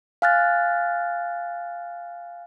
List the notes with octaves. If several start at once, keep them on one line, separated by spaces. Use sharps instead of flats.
F5 G#5 F6 F#6 A6